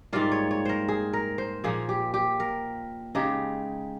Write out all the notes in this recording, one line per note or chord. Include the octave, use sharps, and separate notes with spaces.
G#2 G3 A#3 F4 F5
C#5
C#5
A#4 C5
G#4
A#4
C5
A#2 F3 A#3 G#4
G4
G4
A#4
C#3 G#3 D#4 G4